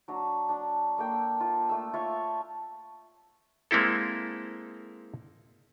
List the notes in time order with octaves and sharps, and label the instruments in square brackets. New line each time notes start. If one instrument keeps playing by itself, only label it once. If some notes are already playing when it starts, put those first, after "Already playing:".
[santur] F#3 D4 A#5
D4
A#3 A4 G5
F4
A3 E6
F4 C#5 E5 C#6
[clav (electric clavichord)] G#3 A#3 C4 E4 A4